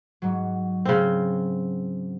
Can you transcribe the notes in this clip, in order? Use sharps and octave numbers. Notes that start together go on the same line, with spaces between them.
G#2 F#3
C#3 C4